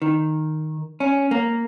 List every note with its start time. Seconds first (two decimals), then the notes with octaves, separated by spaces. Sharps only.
0.02 D#3
1.00 C#4
1.31 A#3